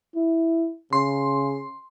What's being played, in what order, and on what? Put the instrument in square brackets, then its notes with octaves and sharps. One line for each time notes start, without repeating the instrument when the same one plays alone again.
[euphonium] E4
[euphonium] C#3 [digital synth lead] C6